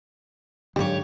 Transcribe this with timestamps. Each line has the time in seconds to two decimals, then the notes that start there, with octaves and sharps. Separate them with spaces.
0.76 G#2 D3 F#3 G3 A#3 G4 C#5